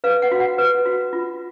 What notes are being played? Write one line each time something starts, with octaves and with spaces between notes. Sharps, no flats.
B4 F5
F#5
F#4
F#5
B4
F#4
F4